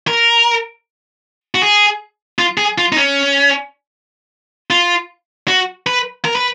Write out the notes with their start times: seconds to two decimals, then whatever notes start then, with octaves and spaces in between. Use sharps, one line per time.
0.07 A#4
1.55 F#4
1.62 G#4
2.39 F4
2.58 G#4
2.78 F4
2.92 D#4
2.97 C#4
4.70 F4
5.48 F#4
5.86 B4
6.25 A#4
6.35 B4